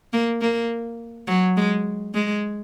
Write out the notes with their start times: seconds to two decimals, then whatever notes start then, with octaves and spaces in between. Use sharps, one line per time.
0.13 A#3
0.41 A#3
1.28 F#3
1.57 G#3
2.14 G#3